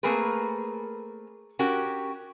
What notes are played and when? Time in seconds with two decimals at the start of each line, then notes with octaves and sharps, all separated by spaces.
0.03 A3 A#3 C4 G#4 A#4 B4
1.59 C#4 F#4 G4 A#4